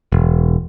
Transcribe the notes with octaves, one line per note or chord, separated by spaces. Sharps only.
E1